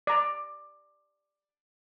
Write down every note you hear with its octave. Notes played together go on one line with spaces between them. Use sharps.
D5 A#5